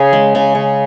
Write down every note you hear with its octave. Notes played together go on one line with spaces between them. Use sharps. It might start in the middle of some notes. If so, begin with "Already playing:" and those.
Already playing: C#3 G#4
G#3
C#3
C#3